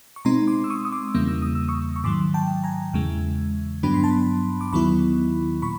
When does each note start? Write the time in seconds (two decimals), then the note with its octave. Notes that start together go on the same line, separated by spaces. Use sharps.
0.16 C#6
0.25 B2 G#3 C4 D#4 A#5 C6
0.48 C6 D6
0.64 E6
0.70 C#6 D#6
0.85 D#6
0.92 C6 D6
1.14 E2 C#3 E3 G3 A#3 D#6
1.28 E6
1.42 D#6
1.55 E6
1.68 C#6 D#6
1.96 C#6
2.04 G#2 D#3 F#3 C6 D6
2.34 G5 A5
2.64 G#5 A#5
2.93 E2 C#3 E3 G#3
3.83 G2 D3 F#3 B3 D4 B5
3.94 C6
4.04 A5 B5
4.61 D6
4.72 D#2 D#3 F#3 B3 E4 B5 C#6
5.62 A#2 B5 C#6